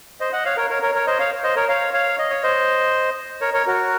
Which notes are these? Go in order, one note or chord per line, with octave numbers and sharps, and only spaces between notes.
C5 D#5
D#5 F#5
C#5 F5
A#4 C#5
A#4 C#5
A#4 C#5
A#4 C#5
C5 D#5
C#5 F5
C5 D#5
A#4 C#5
C#5 F5
C#5 F5
D#5
C#5
C5 D#5
A#4 C#5
A#4 C#5
F#4 A#4